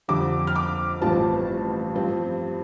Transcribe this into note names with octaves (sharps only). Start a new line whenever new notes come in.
F2 D3 G3 D6
F6
D6
A1 G2 F3 C4 A5
G2 F3 C4